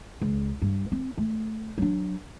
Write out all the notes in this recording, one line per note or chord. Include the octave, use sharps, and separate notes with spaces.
C#2
G2
C4
A3
F#3 D4